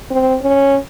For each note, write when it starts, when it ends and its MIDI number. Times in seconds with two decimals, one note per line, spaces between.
0.11 0.37 60
0.42 0.77 61